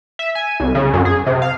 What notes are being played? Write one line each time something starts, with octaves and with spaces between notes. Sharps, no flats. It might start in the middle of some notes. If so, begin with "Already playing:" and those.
E5
G#5
C2
C#3
F#2
G#4
C3
F5